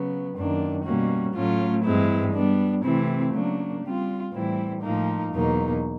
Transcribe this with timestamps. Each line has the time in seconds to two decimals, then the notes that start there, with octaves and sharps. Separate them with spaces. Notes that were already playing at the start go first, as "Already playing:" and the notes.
Already playing: C#3 F#3 B3
0.35 F#2 D#3 F#3 A#3 D4
0.84 B2 G3 A#3 C#4 F#4
1.34 A2 F#3 A3 C#4 F4
1.84 G2 E3 G#3 C4 E4
2.34 G3 B3 D4
2.83 C3 E3 A3 C4 E4
3.33 C#3 F#3 A#3 D4
3.83 G3 C4 F4
4.32 A2 E3 G3 C4 E4
4.82 A2 F3 A#3 D#4
5.32 E2 B2 F#3 A#3 D#4